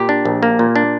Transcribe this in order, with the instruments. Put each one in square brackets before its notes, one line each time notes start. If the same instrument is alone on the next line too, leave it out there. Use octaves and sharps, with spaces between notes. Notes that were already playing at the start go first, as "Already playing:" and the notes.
Already playing: [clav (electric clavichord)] A#2 G4
D4
A#1
A#3
A#2
D4